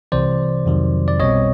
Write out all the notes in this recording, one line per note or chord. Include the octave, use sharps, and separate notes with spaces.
C2 C3 E3 C5 D5
F2 C3 D#3 F#3
D5
B1 B2 G3 C4 C#5 D#5